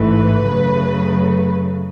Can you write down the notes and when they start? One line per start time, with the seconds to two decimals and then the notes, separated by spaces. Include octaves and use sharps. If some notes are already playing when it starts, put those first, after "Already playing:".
Already playing: A1 G#2 E3 A3 B4
0.46 F#2 C#3 F#3 A3